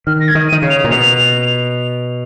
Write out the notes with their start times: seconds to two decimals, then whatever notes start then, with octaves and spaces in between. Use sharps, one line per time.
0.07 D#3 F6
0.20 A#6
0.28 G#6
0.35 D#3
0.49 D#7
0.52 D#3
0.62 C#3
0.70 F7
0.84 A#2
0.91 B2 F7